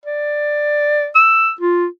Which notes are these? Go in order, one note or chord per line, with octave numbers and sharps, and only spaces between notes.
D5
E6
F4